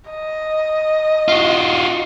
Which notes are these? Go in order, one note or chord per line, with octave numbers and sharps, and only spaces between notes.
D#5
F4 F#4